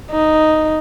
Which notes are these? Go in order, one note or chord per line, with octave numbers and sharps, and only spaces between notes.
D#4